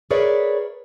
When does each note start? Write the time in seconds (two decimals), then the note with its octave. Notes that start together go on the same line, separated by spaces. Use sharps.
0.11 G#4 A#4 B4 C#5 D5 E5